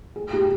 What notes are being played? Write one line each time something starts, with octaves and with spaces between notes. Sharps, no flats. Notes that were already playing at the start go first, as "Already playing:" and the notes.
G#4
G4